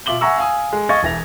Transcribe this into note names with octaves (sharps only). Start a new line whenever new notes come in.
B2 F4 E5 D6 F#7 G7
E5 F#5 G#5 A#5 C#6 E6
F5 G#5 D#6
G#3
D#5 F5 C#6 G#6 A6
E1 E3 A#6 F7